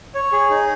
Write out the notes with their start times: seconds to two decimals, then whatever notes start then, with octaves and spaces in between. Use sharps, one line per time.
0.15 C#5
0.32 G#4
0.50 D#4